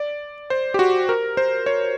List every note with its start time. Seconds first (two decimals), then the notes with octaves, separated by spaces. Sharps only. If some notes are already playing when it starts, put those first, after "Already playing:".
Already playing: D5
0.50 C5
0.74 G4
0.79 F#4
1.09 A#4
1.37 C5
1.66 C#5